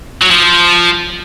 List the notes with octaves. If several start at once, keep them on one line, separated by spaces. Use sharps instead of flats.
F#3
F3